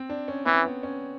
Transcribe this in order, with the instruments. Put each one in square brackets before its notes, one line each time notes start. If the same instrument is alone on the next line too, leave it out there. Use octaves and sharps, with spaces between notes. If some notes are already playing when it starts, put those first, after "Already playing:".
Already playing: [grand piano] C4
D4
C#4
[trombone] E3 [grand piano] C4
[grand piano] B3
C#4